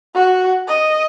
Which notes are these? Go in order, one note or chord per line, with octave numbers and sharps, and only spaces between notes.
F#4
D#5